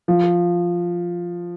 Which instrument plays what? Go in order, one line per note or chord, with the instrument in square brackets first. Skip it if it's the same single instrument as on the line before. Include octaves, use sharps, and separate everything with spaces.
[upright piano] F3